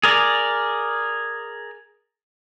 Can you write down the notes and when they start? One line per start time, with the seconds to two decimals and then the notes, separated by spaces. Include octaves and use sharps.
0.04 G#4 A#4 D5